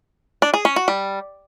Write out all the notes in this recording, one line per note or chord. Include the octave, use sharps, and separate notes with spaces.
D4
G#4
C#4
F#4
G3